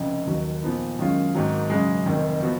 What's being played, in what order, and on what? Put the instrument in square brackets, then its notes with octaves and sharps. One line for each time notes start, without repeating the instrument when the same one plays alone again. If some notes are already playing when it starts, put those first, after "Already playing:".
Already playing: [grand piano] F1 F2 C#3
D#2 D#3 F#3
A#2 F3 B3 D#4
F#2 D#3 G#3 C#4 F4
G#1 G#2 D#3 F#3
F#2 C#3 G#3
F1 F2 D#3
F3 B3 F#4